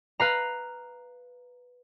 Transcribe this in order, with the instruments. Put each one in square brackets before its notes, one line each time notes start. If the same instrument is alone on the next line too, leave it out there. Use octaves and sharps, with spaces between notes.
[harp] B4 F5 A#5